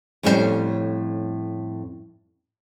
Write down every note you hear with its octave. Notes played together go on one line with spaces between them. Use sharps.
F2 A2 G3 C#4 F#4 C5